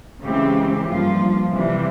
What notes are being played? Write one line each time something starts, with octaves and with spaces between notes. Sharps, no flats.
C#3 E3 G#3 C4 G4
G2 F3 A#3 F4
C3 E3 G3